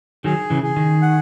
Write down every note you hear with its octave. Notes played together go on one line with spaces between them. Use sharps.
D#3 F#3 G#4
C#3 E3
G#4
D#3
F#5